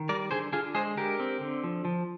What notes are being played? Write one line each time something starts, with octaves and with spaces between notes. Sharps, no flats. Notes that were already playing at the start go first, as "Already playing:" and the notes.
Already playing: D#3
G3 A#4 D5
D3 G#4 C5
D3 F4 G#4
G#3 G#4 C5
D3 G4 A#4
C4
D3
F3
F3